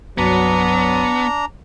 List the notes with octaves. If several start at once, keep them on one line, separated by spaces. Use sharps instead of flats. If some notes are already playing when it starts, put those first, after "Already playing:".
C2 G2 F#3 B3 D4 A#5